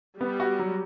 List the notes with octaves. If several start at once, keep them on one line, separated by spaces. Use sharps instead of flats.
G3 B3
F#4
F#3